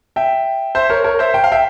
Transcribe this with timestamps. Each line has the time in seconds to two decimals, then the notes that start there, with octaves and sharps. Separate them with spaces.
0.16 E5 G5
0.75 C5 E5
0.90 A#4 C#5
1.04 A#4 C#5
1.19 C5 E5
1.34 G5
1.44 F5
1.52 E5 G5